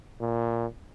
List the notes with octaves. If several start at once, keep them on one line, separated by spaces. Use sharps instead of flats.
A#2